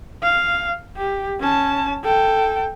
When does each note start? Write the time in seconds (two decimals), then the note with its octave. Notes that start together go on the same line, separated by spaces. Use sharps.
0.23 F5
0.97 G4
1.40 C#4 A5
2.04 A4 G5